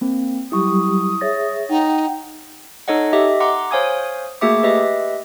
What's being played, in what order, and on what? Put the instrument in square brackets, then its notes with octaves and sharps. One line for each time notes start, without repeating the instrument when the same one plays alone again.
[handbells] A#3 C4
[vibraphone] F#3 G3 G4 [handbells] E4 C#6 [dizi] D#6
[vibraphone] G#4 E5 [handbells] C#5 A6 A#6
[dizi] D#4 [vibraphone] F#5 G5
[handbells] D#4 A4 C#5 D#5 F#5
G4 D#5 E5
F#5 A#5 C6 D6
C5 C#5 F5 G#5 D#6 G#6
A3 A#3 F#4 G#4 E5 D6
G4 B4 D#5 E5